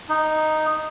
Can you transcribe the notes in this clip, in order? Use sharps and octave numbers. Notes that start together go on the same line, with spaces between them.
D#4